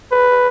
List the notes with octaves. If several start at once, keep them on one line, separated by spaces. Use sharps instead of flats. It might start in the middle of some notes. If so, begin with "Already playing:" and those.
B4